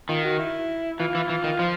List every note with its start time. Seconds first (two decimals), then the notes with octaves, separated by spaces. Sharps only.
0.09 D#3 F4
0.24 F#4
0.39 E4
0.99 E3 F4
1.15 E3
1.30 E3
1.44 D#3
1.59 F3